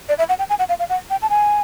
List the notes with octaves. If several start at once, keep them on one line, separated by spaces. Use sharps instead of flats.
D5
E5
F#5
G5
G#5
F#5
F5
F5
F#5
G5
A5
G#5